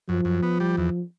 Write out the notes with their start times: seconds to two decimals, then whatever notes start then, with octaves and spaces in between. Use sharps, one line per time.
0.09 F#2 F3
0.25 F#2
0.43 B3
0.60 G3
0.77 E2